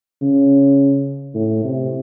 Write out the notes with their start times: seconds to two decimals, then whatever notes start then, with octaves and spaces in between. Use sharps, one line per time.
0.22 C#3
1.35 A2
1.64 C3